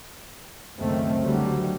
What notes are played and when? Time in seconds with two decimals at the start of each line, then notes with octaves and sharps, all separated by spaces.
0.79 C#2 F#2 D#3 A3 C4
1.23 D3 F#3 G3 A3